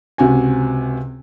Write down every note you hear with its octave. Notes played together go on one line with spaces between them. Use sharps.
C#2 C3 F#4 G#5